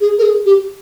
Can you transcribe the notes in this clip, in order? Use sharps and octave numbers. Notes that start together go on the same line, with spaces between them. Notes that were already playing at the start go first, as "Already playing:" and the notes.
G#4
A#4
G#4
G4